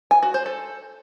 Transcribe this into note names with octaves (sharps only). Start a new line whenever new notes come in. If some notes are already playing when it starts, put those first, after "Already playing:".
G#5
F#4
C5
A4